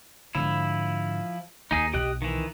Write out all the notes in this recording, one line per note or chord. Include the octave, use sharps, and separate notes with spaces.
G#2 D3 F3 E4
D#2 D#4 G#4
B1 G4 D#5 F#6
D#3 E3